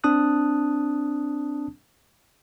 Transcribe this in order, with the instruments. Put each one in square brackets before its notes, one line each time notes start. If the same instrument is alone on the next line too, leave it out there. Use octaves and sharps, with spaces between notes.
[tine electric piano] C4 D4 A5 D#6 F#6